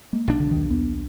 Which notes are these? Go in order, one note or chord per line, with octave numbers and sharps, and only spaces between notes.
G#3 A#3
B1 D4
D3
D#2 D#3
D#2 B3